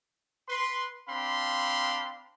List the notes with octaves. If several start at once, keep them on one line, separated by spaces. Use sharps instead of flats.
B4 C6
C4 D4 F5 B5 C6